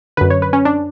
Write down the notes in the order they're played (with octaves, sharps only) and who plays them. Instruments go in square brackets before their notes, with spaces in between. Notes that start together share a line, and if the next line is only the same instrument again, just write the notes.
[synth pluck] F#2 D3 B4
C#5
B4
C#4
D4